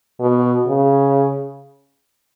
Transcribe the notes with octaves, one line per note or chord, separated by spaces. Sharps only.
B2
C#3